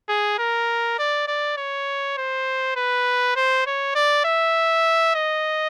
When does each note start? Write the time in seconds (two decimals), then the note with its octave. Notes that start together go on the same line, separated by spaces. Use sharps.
0.09 G#4
0.39 A#4
0.99 D5
1.28 D5
1.57 C#5
2.18 C5
2.76 B4
3.36 C5
3.66 C#5
3.95 D5
4.25 E5
5.15 D#5